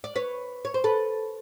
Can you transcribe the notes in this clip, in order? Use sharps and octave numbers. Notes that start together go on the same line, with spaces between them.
D5
B4 C#5
C#5
C5
A4 B4